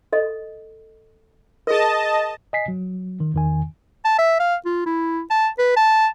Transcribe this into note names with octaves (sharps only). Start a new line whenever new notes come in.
A4 D#5
G#4 A#4 D#5 A5
D#5 G#5 B6 C7
F#3
D#3
E2 D#3 G#5
A5
E5
F5
F4
E4
A5
B4
A5